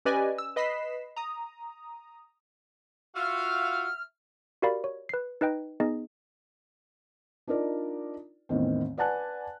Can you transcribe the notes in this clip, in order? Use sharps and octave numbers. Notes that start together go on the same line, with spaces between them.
C#4 G4 B4 D5 D#5 G#5
E6
B4 D#5 B5 B6 C7 E7
A#5 D#6
F4 F#4 E5 F5 F6
F#4 G4 A#4 D5 F5 B5
C#5
B4 C7
D#4 B4 D#5 G5
B3 D#4 G#4 D#5
D4 D#4 F4 A#4 D5
A1 E2 D#3 C4
B4 D5 F#5 G#5 A5 F#6